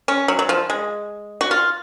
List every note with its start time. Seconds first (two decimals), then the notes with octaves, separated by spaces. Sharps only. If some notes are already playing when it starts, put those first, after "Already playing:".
0.08 C#4
0.28 F#3
0.39 F#3
0.49 F3
0.70 G#3
1.41 F#4
1.51 F4